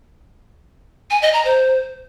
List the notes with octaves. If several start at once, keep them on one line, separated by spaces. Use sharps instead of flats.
G#5
D#5
A#5
C5